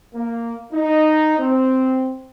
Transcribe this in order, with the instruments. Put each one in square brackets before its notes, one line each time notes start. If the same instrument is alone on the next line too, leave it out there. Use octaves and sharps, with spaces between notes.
[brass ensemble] A#3
D#4
C4